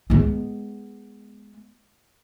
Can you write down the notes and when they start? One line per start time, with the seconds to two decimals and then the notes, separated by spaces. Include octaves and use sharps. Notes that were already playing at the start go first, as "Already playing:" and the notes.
0.10 G#3 B3